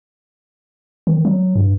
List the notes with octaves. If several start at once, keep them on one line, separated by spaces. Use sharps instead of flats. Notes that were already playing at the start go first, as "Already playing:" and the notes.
D#3
F#3
G2